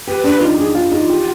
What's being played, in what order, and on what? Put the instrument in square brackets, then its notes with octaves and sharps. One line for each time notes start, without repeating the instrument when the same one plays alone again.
[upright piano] G4 [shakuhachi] B4
[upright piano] D4 [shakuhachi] B4
[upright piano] D#4 [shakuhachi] F4
[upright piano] D#4 [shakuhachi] G#4
[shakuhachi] D#4 [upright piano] F4
[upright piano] D#4 [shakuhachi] G#4
[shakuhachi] F4
[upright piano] G4